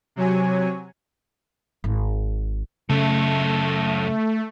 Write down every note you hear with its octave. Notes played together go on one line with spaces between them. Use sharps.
C3 F#3 C#5 G#5
G#1
F#2 C#3 A3 A4